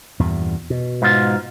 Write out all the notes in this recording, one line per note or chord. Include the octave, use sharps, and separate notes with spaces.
E2 G2 A#2
B2
G#2 F4